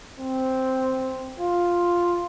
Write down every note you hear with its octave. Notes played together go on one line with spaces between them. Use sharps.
C4
F4